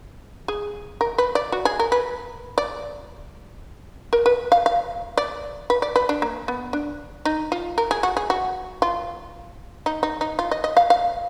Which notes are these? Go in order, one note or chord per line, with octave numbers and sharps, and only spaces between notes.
G#4
A#4
B4
D5
F#4
G#4
A#4
B4
D5
A#4
B4
F5
F5
D5
B4
D5
B4
D4
A#3
B3
D4
D#4
F4
A#4
G#4
F#4
G#4
F#4
F4
D#4
D#4
D#4
F4
D#5
D#5
F5
F5